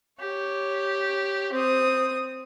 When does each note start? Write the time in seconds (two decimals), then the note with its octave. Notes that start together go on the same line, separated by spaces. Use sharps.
0.20 G4 C#5
1.53 C4 D#6